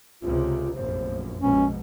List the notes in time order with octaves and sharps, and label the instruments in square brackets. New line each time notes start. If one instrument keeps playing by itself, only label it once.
[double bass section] C#2 C3 [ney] F4
[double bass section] F1 A#1 F#2 [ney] C5
[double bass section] A#1 B2 [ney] G#3 [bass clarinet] C#4